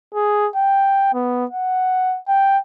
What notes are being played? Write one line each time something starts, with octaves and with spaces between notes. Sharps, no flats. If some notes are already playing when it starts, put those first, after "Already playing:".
G#4
G5
B3
F#5
G5